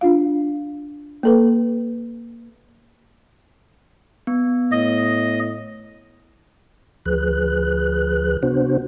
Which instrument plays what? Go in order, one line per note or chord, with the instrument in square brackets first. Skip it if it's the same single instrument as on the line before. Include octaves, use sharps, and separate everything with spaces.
[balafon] D4 F4 F5
A#3 A4 B4
[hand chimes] B3
[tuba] A2 [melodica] D#5
[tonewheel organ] D2 F3 G#4 B4 F#6
C3 B3 D4 F#4 C5